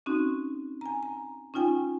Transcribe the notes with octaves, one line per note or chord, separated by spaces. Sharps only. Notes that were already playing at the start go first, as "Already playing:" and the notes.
C4 C#4 D#4 F#4
G#5 A#5
A#5
C#4 D#4 F4 G5 G#5